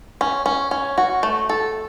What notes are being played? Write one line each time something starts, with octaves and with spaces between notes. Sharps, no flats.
C#4
C#4
C#4
F#4
A3
A4